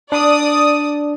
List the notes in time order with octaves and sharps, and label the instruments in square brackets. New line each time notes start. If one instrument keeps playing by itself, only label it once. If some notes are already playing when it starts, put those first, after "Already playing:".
[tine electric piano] D4 [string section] D5 D#6